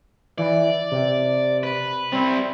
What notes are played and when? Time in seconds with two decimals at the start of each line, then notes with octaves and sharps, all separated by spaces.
0.38 E3 D5
0.91 C3
1.63 B4
2.12 G3 C4 E4